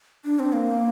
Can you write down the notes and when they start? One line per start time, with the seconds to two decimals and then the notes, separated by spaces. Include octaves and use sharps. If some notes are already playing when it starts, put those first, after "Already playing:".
0.25 D4
0.39 C4
0.53 A#3